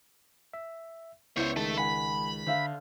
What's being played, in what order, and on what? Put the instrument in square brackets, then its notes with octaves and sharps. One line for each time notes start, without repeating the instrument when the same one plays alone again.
[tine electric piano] E5
[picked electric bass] C#2 [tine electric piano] B3 [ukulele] E4 E5 [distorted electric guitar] C5 C#5
[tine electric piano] D#3 G#3 [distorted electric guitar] A3 A4
[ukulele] F#5 G#5 [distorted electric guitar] B5
[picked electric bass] D3 [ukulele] C5 E5 F5